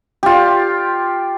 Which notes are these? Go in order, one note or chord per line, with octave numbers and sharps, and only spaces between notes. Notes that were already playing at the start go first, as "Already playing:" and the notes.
F4 G4